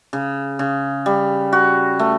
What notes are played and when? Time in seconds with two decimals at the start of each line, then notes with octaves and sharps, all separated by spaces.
0.13 C#3
0.59 C#3
1.06 G3
1.52 F#4
1.99 A3